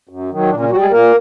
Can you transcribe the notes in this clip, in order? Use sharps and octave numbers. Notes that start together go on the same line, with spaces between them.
F#2
D#3 F#3
A#2 D3 D4
C#3 C#4
F#3 G3 F#4
G#3 G#4
A#2 A#3 A#4